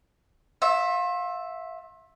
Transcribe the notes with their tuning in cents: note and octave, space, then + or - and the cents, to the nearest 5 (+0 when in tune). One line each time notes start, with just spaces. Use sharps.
F4 +35 E5 +0